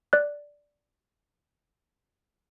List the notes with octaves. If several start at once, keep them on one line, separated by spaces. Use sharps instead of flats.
D5 F#6